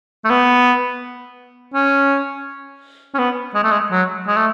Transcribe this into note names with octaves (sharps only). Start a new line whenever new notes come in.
A3
B3
C#4
C#4
B3
G#3
A3
G#3
F#3
G#3
A3